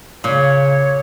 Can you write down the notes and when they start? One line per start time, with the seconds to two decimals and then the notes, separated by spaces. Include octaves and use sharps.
0.24 A#2 C#3 C#5